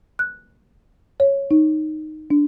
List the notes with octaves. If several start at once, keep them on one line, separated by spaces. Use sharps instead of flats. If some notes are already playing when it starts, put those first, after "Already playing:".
F#6
C#5
D#4
D4